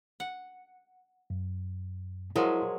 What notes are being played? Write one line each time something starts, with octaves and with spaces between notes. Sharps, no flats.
F#5
F#2
F3 F#3 G#3 E4 A#4 F5 C6